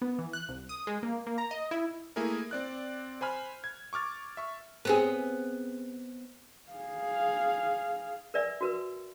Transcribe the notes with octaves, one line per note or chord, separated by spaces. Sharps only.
B3
E3
F#6
C2
D#6
G#3
A#3
A#3
A#5
D#5
E4
A3 A#3 E4 G#4 A#4
C4 D5 F#6
C5 G#5 B5 F6
G#6
C#6 D6 F6 A6
E5 C#6
B3 C4 G#4
G#4 F5
A#4 B4 D5 E5 G#5
F#4 A#4 B4